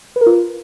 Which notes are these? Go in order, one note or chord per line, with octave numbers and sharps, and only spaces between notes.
B4
A#4
F4